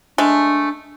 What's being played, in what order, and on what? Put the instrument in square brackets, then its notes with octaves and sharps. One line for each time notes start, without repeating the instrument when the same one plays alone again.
[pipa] G#3 A3 [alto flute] D4